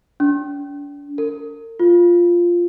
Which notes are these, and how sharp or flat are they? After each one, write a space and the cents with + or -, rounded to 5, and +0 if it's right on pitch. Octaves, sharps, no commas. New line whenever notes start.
D4 -40
A#4 -40
F4 -5